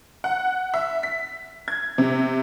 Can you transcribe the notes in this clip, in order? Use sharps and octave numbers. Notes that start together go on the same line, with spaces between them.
F#5
E5
B6
G#6
C3